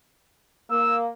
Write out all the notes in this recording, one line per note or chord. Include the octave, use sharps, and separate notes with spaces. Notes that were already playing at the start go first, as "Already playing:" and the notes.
A#3 E6